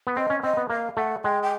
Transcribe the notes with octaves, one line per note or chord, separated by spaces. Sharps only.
B3
C4 D#5
C#4
C4 D#5
B3
A#3 F5
A3 F#5
G#3 G5
G5